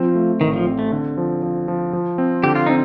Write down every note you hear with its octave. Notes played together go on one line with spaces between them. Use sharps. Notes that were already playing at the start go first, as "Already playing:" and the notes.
Already playing: F3 C4
A3
A1 D#3
F3
C4
A3
D3
F3
F3
F3
F3
C4
D3 G4
F4
C4 D#4